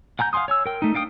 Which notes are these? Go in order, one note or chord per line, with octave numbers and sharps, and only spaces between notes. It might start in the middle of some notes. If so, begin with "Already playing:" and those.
F#5 G#5 A#5 G6
F5 F#5 G#5 C6 D#6
C#5 G#5 E6
A#4 G5
A3 D#4
D4 F5 G5 D#6